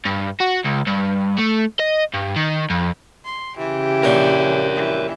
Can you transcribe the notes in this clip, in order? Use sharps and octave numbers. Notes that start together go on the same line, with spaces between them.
G2
F#4
C#2
G2
A3
D#5
G2
D#3
F2
C6
C#3 E3 G4
A#1 D4 A#4 C#5 G#5
E3